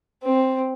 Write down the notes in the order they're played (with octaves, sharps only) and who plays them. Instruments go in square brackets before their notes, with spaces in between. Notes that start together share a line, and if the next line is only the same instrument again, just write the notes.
[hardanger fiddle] C4